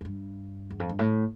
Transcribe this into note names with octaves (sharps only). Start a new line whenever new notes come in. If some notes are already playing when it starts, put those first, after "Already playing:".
F2
G2
E2
F2
G2
A2